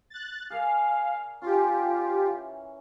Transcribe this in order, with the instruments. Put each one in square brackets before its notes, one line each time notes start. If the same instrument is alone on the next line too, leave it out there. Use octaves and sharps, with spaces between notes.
[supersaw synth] F#6 A6
[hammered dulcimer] G#4 A#4 D5 [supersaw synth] F5
[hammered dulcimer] C#4 [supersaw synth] F4 G4
[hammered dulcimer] E3